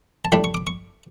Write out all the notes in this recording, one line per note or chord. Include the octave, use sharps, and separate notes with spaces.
A5
A2 G3 D4 B5
C#6
D6
C#6